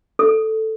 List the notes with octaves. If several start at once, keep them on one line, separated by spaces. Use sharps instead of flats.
A4